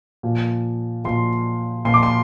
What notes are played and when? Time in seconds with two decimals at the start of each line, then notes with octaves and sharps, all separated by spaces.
0.23 A#2 F3
1.05 A#2 F3 C6
1.85 A#2 F3 C6
1.94 D6
2.03 C6